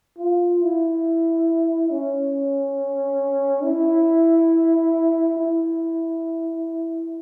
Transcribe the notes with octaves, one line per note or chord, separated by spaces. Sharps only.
F4
E4
C#4
E4
E4